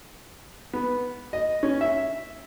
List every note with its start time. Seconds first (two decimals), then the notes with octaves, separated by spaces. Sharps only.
0.73 B3
1.33 D#5
1.63 C#4
1.81 E5